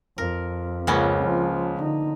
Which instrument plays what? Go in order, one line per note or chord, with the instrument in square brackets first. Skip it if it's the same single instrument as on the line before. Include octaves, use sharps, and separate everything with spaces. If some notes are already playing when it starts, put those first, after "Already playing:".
[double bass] F2 [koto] A#4
[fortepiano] C#2 [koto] A#3 B3 C#4
[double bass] F3
D3 D#4